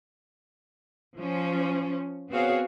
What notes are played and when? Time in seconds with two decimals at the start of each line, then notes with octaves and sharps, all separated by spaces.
1.18 F3 C#4
2.30 B3 C4 F#4 G#4 C#5 F5